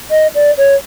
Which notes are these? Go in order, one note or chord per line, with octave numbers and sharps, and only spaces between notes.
D#5
D5
C#5